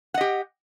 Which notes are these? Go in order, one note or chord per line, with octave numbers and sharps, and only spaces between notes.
G4 D#5 F#5